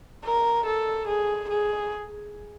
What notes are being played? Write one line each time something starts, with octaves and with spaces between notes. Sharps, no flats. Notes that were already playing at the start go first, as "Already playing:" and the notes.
A#4
A4
G#4
G#4